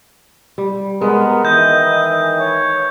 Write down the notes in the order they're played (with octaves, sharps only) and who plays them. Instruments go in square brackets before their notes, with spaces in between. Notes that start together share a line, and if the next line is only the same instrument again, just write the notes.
[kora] G3
[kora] G#3 [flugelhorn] B3 [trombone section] A#4
[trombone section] D#3 E3 [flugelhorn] D#5 [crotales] G6
[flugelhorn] C#5